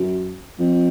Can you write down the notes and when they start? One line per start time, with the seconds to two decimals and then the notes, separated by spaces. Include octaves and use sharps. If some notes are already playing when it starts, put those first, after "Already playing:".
Already playing: F#2
0.59 F2